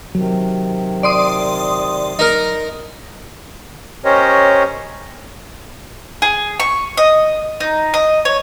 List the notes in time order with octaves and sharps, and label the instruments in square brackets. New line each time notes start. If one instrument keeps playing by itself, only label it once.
[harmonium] C3 D#3 [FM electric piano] F#3
[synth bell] D5 C6 D#6
[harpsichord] D#4 A#4
[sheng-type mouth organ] C#4 G4 A#4 C5 C#5 D#5
[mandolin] G#4
C#6
D#5
D#4
D#5
C#5